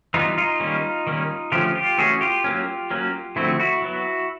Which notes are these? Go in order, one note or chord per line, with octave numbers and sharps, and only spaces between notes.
E3 G3 B3 D#4 F4
D#4 F4
D#3 G3 A#3 C#4
D#3 G3 A#3 C#4
D3 F3 A3 C#4 F4 G4
F4 G4
E3 A3 C#4 F#4 G#4
F4 G4
F#3 A#3 C#4
F#3 A#3 C#4
D3 F3 A3 C4 E4 F#4
E4 F#4
F#3 B3